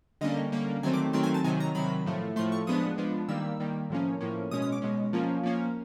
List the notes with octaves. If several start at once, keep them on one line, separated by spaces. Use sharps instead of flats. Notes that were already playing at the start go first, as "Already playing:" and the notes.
D3 G3 A#3 C#4 D#5
D3 G3 A#3 C#4
D#3 F#3 A3 C4 G#5
D6
D#3 F#3 A3 C4 C6
G#5
A5
C3 D#3 F#3 G#5
A#5
C3 D#3 F#3 B5
A2 F3 A3
A2 F3 A3 C6
C#6
F3 G#3 B3 D4 D#6
F3 G#3 B3 D4
D#3 G3 A#3 E6
D#3 G3 A#3
A2 F3 A#3 C#4
A2 F3 A#3 C#4
B2 G#3 C#4 D#6
D#6
D6
B2 G#3 C#4
F3 A#3 C#4
F3 A#3 C#4